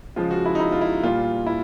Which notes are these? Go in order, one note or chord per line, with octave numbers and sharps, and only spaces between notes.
C#3 F3 G#3 F4
F#4
E4
D#4
E4
F4
E4
A#2 G3 F4
E4